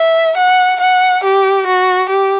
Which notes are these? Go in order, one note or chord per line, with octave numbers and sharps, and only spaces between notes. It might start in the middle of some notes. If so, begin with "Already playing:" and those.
Already playing: E5
F#5
F#5
G4
F#4
G4